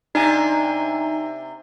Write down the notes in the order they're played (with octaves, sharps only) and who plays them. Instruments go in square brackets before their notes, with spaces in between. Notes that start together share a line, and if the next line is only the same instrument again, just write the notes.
[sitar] C3 D4 [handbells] D#4 G#5